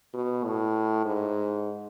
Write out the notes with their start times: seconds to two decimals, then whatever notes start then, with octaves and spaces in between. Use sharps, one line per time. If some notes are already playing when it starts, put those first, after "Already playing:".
0.14 B2
0.44 A2
1.06 G#2